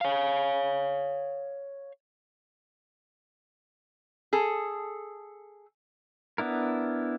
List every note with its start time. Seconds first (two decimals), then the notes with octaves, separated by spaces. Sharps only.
0.01 C#5 F5
4.33 G#4 A4
6.38 B3 D4 E4 A#4